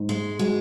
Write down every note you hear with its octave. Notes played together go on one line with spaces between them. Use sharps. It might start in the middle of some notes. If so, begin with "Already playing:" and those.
Already playing: G#2
G#3
G#3 F#4